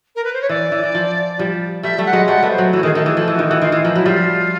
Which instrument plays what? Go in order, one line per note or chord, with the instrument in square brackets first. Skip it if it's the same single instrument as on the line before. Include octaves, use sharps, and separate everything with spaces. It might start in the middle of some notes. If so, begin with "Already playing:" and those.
[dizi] A#4
B4
C5
C#5
[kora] E3 [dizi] D5
[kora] E3
E3
F3
F3 G3
[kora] G3 A3 [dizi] E5
[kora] G3 A3
[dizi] F#5
[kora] F#3 G#3
[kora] G3 A3 [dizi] F#5
[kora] A3 B3 [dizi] B4
[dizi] C5
[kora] F#3
[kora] E3 [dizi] F#4
[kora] D#3 [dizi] G#4
[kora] D#3 [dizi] A4
[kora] E3 [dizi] G#4
[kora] F3 [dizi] A4
[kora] E3 [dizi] F#4
[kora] D#3 [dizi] G4
[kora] E3 [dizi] F#4
[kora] D#3 [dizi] F4
[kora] E3 [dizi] F4
[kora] F3 [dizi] D#4
[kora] F#3 [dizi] E4
[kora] F3 G3 [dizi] F4